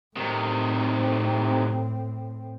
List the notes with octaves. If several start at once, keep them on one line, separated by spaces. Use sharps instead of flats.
A2 C3 D#3 C4